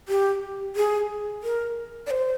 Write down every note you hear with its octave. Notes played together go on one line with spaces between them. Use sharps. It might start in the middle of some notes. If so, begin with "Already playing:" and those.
G4
G#4
A#4
D5
C5